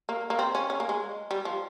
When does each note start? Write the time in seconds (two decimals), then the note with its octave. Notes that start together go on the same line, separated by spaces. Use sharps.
0.09 A#3
0.30 A#3
0.39 C4
0.55 C#4
0.70 C#4
0.80 A#3
0.89 G#3
1.31 G3
1.45 F3